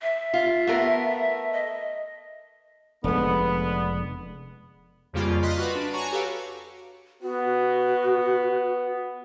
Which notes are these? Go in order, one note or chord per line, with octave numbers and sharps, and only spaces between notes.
E5
F4
A3 B3 A#4
D#5
F1 D3 G#3 B3
F2 C#3 G3 A#3 F4
D#5 F5 C6 F6 F#6 B6
F#4 B4 F5
D4
F#4 C#5 G#5 A#5 C#6
F#4 G4 A4 B4 F5
B3 F#4